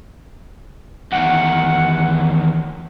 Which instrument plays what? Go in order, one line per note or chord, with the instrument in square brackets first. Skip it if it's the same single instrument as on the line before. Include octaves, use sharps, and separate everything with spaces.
[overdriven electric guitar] E2 D#3 [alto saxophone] F#5